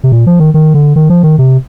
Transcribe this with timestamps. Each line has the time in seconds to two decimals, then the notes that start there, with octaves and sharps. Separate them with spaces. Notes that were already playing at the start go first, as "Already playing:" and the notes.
0.04 C3
0.12 A#2
0.27 F3
0.40 D#3
0.54 D#3
0.74 D3
0.96 D#3
1.10 F3
1.23 D#3
1.38 C3